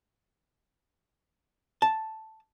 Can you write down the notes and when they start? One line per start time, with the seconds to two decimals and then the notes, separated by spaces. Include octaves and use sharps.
1.82 A5